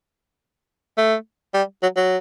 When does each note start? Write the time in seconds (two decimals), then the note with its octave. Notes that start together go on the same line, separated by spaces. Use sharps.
0.98 A3
1.54 G3
1.82 F#3
1.96 F#3